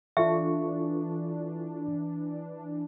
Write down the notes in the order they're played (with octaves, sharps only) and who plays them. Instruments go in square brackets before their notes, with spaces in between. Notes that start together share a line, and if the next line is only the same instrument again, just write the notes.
[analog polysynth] E3 D4 [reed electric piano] F4 A4 C#6 [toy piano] E5